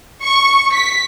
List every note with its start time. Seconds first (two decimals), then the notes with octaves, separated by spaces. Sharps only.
0.23 C#6
0.74 B6